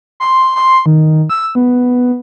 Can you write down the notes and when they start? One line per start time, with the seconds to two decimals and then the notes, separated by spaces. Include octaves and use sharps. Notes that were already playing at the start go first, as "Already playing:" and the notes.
0.20 C6
0.56 C6
0.86 D#3
1.30 E6
1.55 B3